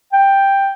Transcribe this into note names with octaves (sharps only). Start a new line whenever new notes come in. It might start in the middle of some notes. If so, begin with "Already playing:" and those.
G5